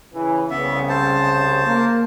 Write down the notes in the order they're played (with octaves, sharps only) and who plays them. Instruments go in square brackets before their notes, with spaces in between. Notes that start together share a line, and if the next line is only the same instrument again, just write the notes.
[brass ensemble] C#3 E3
[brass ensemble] C2 C#3 [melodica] B3 E5
[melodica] C5 A5
[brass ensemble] A#3